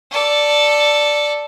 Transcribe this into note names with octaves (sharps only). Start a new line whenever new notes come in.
A4 D5